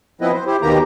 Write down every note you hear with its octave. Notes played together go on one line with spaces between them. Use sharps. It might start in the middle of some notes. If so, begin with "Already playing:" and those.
F3 B3 C4 E4 B4 D#5
C5
E4 G4 C5
D#2 B2 D#3 A#3 G4 A#5